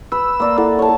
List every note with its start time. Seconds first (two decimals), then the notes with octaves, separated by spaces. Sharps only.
0.12 B4 E6
0.40 A#3 D5 A#5
0.58 E4 A4 F#5
0.79 C#5 A5